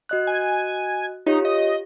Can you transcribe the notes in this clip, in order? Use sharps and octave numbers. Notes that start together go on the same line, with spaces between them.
F#4 D#5 F#6
G#5
D#4 F4 G4 C#5
D#5